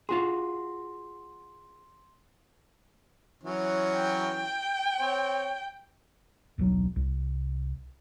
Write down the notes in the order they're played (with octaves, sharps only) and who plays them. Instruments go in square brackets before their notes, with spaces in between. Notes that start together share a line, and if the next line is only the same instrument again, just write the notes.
[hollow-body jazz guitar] F4 F#4 G#4 [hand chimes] C6
[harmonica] E3 F#3 C#4
[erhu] G5
[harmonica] C4 C#5
[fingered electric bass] D#1 B1 C#3 F#3
C2